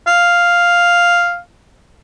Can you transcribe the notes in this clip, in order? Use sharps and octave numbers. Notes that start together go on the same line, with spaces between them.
F5